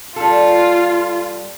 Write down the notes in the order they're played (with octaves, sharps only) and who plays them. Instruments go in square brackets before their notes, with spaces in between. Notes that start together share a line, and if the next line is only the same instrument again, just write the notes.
[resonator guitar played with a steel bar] G3 A4 [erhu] F4